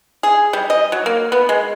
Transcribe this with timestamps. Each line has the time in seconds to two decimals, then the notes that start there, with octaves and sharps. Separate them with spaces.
0.23 G#4
0.53 G3
0.70 D#5
0.92 F#3
1.06 A#3
1.32 B3
1.49 G#3